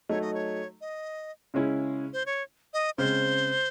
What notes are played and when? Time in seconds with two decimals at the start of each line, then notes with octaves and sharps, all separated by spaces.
0.09 F#3 A3 D#4 C#5
0.22 D#5
0.34 C#5
0.81 D#5
1.54 C#3 G#3 C#4 E4
2.13 C5
2.26 C#5
2.73 D#5
2.98 C#3 G#3 C4 C5